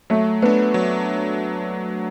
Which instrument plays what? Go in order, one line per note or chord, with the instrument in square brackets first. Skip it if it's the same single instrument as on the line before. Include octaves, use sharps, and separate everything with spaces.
[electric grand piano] F#3 [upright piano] A3
[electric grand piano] A3 D4 [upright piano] B3
[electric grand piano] F#3